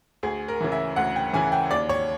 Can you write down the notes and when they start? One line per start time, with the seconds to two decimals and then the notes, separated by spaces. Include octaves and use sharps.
0.23 D2 G#4
0.48 A#4
0.61 C#3 E3
0.72 E5
0.96 D2 F#5
1.16 G5
1.33 C#3 E3 G#5
1.52 G5
1.71 D#2 D5
1.89 C#5